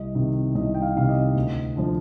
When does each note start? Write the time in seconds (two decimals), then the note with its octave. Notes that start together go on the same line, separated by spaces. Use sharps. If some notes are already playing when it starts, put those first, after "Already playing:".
Already playing: C2 D#5
0.15 C3 D#3
0.55 C2 D#5
0.74 G5
0.82 F5
0.96 C3 D#3 F5
1.09 D#5
1.36 D2
1.76 D3 F3